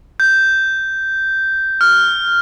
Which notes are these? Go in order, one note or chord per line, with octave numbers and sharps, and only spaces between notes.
G6
F6